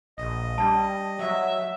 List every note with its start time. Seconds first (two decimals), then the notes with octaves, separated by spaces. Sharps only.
0.18 A#1 D#5
0.58 G3 D4 A5
1.19 F#3 E5